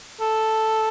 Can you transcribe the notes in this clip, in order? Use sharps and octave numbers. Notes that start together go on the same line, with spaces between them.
A4